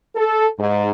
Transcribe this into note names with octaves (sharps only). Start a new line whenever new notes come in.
A4
G#2